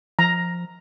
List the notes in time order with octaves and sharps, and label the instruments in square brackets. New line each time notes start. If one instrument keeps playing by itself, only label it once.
[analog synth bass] F3 [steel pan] A#5